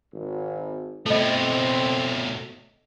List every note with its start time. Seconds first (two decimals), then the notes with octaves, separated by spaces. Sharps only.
0.12 G#1
1.06 B2 A3 C4 A4 D#5